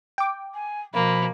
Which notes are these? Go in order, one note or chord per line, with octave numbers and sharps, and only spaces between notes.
G5 D6
G#5
B2 F3 A#3 B5